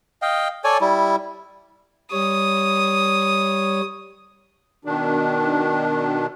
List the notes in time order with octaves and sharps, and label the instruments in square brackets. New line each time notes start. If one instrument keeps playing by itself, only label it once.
[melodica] D#5 F5 G5
A4 C#5 D5 G#5
G3 E4
[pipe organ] G3 C#5 [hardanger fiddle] D#6
[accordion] B2 D#3 D4